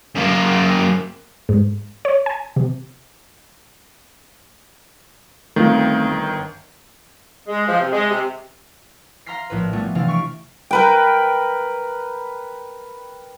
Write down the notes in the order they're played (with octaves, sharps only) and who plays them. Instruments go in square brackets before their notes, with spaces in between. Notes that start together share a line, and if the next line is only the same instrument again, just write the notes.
[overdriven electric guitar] F#2 A#3
[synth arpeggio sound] G#2
C#5
G#5
C3
[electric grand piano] G1 D#3 [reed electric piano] A3 C4 F4
[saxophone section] G#3
F3
C3
G#3
C3
[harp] F5 A#5 C6 F6 B6 C7
A#1 A2 B4
G3 A3 B3 F4
C3 E3 D4 F5
C#6 F6 B6 D7
[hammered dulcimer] A#4 B4 G5